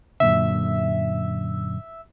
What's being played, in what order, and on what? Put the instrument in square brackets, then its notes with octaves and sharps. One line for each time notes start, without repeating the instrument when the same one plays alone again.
[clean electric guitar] F#2 A#2 D3 [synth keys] E5